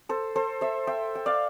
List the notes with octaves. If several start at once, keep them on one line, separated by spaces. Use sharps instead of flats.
A4 C5
A4 C5
C5 E5
E5 G5
G5
D5 F5